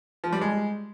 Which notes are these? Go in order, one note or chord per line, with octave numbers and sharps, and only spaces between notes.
F3
G3
G#3